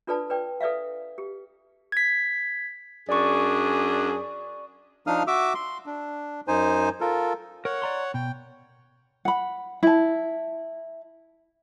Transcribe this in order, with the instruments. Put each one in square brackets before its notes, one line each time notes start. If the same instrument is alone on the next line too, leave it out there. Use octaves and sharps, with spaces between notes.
[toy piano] D4 F4 A4 B4 D5 A5
B4 D5 G5
A4 B4 D5 E5 F5
G4
[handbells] G#6 B6
[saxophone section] F#2 D4 G#4 [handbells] D5 C#6
[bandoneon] F3 D4 D#4 F5 D#6 F6
F#4 E5 D6 E6
C6
D4
F#2 D#4 C5 G#5
F4 A4 A#4
[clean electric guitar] A#4 [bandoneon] C#5 F#5
[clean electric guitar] D5 A#5 C6
[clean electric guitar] B2 [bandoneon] G5
[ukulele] F#5 B5
E4 A5